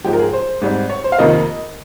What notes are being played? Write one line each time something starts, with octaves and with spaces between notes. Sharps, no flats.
G#2 F3 G#3 G4
A#4
G#4
C5
G#2 G3 C4
C#5
C5
F5
F2 C3 D#3 A#3 D#5